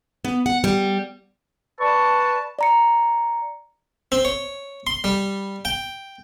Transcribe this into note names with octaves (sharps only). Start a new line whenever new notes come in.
B3
F#5
G3
B4 D5 A5 C#6
D5 A#5 C#7
C4
C#5
C6
G3
G5